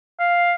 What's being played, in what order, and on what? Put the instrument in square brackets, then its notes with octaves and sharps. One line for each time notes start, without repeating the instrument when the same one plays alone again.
[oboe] F5